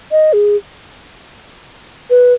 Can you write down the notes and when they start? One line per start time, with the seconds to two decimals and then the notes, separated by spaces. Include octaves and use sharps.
0.11 D#5
0.33 G#4
2.10 B4